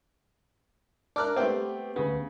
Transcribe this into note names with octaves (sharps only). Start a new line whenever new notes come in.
D4 A#4 D6 F6 F#6
A3 B3 C4 G4
D2 C#3 B3